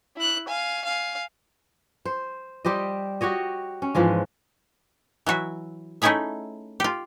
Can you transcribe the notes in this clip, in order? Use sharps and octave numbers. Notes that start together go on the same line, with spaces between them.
E4 F#6
F5 G#5
F5 G#5
C5
G3 G4 C5 D#5
F#4 G4 C#5 D#5
C#4
G#2 E3 F3 G#3
E3 F#3 F#4 E5
A3 C#4 D#4 E4 G#4 E5
F4 G4